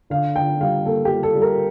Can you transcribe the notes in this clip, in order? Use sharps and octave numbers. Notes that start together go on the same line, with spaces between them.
D3 F5
D3 G5
G3 F5
A#3 A4
G4
G3
A4
G3
A#4